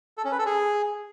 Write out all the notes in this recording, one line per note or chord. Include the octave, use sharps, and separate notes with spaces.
A4
C#4
B4
A4
G#4